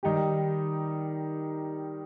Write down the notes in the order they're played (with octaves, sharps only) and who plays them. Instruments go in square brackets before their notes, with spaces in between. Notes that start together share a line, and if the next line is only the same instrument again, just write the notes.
[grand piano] D#3 G3 D#4 G4